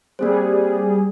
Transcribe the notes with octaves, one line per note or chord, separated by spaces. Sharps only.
G3 A#3 C4 G#4 C5